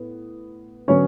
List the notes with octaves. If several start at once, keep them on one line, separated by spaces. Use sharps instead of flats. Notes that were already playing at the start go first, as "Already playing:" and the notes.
Already playing: A2 B3
D3 F#3 B3 C#4 C#5